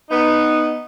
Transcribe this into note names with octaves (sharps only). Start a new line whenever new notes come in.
B3 D#4